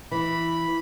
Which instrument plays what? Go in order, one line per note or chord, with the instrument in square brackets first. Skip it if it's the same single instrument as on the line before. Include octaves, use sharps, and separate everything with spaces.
[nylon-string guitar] E3 [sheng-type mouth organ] B5